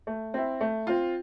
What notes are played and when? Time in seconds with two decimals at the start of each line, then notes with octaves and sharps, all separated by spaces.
0.07 A3
0.34 C4 E4
0.61 A3
0.87 C4 F4